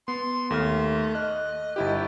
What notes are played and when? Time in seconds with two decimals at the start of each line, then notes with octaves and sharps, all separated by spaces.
0.08 B3 C6
0.50 D#2 A3 F6
1.15 D#5 F6 F#6
1.76 G1 E4 G4